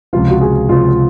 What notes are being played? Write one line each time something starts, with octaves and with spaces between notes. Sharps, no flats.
C#2 C3 F3 F4
F#4
G#4
C#2 C3 F3 F4